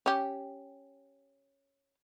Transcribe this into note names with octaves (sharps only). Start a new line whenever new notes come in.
C#4 G4